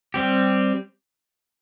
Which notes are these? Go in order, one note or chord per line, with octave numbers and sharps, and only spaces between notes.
G3 C4 G4